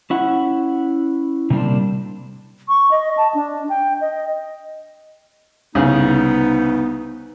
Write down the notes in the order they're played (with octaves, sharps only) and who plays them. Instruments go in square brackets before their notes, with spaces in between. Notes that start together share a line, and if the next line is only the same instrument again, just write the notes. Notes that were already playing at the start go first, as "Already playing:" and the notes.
[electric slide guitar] C#4 E4 F#5
C3 G3 A#3 C4 D4
[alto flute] C#6
D#5
A5
D4
G5
D#5
[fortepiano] C2 C#3 [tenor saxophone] B3 [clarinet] D#4